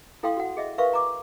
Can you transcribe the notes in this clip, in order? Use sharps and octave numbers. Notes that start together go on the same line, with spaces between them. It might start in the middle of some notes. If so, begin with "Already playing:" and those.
E4 A4 F5 G5 C6 D#6
F#4 F#5
G#4 D#5 E5
A#4 B4 E5 F5 C6 C#6
A#5 D6